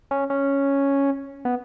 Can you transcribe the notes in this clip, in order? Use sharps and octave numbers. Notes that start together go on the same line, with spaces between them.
C#4
C#4
B3